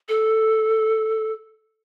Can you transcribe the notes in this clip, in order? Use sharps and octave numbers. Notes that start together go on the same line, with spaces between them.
A4